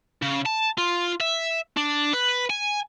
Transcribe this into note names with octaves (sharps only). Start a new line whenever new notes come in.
C#3
A5
F4
E5
D4
B4
G#5